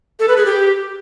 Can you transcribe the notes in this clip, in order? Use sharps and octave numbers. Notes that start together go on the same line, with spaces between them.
A4
B4
G#4
G4